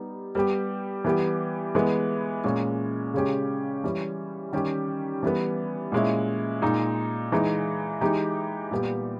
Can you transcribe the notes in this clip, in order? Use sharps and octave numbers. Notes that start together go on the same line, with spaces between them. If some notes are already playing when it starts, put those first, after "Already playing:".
Already playing: G3 B3 D#4 G4
G3 B3 G4
E3 G3 B3 G4
E3 G#3 B3
A#2 G#3 C#4
C#3 G#3 C#4 G4
E3 G3 C#4
D#3 G3 C#4 G4
E3 G3 B3
A#2 G#3 C#4 E4
A#2 G#3 D#4
E3 G#3 D#4
E3 G#3 D#4 G4
A#2 G3 B3 G4